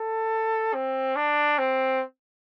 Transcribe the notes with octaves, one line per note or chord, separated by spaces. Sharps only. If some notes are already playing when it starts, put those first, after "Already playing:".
Already playing: A4
C4
D4
C4